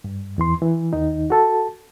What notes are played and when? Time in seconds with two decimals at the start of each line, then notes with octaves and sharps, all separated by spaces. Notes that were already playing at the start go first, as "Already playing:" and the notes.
0.04 G2
0.38 E2 E3 C6
0.62 E3
0.93 D#2 D#3 D#4
1.30 F#4 A4 A5